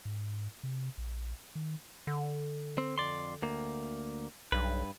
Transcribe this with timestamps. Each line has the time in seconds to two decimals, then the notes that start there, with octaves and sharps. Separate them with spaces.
0.05 G#2
0.63 C3
0.98 A#1
1.55 D#3
2.07 D3
2.78 C4
2.98 F2 D5 C6
3.42 D2 A#3
4.52 B1 G2 B4